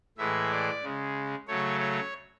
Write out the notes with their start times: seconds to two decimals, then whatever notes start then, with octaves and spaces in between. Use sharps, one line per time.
0.18 A2 E3 G#3 E5
0.51 D5
0.83 C#3 G#3
1.48 C#3 F#3 A3 C#5
1.80 C#5